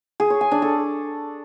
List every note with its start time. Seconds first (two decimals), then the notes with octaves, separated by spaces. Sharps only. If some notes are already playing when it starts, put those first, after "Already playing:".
0.20 G#4
0.30 C#5
0.41 G#5
0.51 D4
0.62 A4